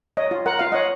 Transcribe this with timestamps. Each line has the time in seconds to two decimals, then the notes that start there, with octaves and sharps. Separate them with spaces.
0.17 C#5 D#5
0.31 F4
0.46 A#4 F#5
0.59 F4 F5
0.72 C#5 D#5 F#5